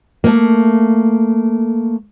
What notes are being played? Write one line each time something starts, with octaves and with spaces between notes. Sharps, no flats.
A3 A#3